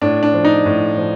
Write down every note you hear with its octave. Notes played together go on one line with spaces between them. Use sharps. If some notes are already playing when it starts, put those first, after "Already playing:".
A2 D4
D4
F3
D#4
A2
F3